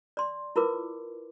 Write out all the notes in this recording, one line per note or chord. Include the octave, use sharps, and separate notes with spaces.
D5 C6
E4 F4 A#4 B4 D6